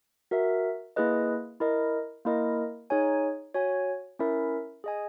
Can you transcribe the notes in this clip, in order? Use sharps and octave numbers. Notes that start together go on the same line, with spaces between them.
F#4 A#4 E5
A#3 E4 G#4 B4 D#5
E4 A#4 D#5
A#3 E4 A#4 D#5
D#4 G#4 C#5 G#5
F#4 C#5 G#5
C#4 E4 A#4 E5
G#4 D#5 G#5